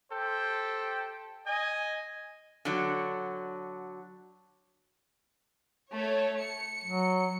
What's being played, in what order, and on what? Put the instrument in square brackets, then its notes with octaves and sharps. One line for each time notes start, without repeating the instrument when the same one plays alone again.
[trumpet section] G4 A4 C5 G5
D#5 G#5
[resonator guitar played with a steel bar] D3 F#3
[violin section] A3 C#5
C#7
[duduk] F#3